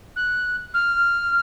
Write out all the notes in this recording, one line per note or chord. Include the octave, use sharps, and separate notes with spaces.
F#6
F6